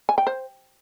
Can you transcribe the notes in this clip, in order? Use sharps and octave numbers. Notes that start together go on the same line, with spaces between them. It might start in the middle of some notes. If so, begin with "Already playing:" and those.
G#5
G5
C5